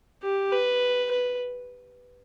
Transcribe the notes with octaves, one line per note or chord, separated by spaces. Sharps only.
G4
B4
B4